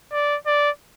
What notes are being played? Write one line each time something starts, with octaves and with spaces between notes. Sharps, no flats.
D5
D5